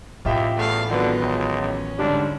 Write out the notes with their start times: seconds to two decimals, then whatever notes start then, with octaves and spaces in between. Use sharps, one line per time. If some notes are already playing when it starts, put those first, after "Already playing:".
0.25 A1 D#2 F4 G4 E5
0.56 E2 A3 F5
0.89 D3 D#3 F#3 B3 F4 B4
1.20 C#2
1.62 C#4
1.99 G#2 D3 G3 D4